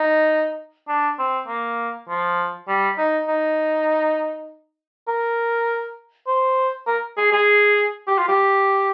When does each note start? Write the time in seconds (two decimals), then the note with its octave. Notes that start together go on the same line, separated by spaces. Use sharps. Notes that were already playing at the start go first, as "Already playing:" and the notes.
Already playing: D#4
0.88 D4
1.18 C4
1.48 A#3
2.09 F3
2.68 G3
2.98 D#4
3.28 D#4
5.08 A#4
6.27 C5
6.87 A#4
7.17 G#4
7.32 G#4
8.07 G4
8.18 F4
8.28 G4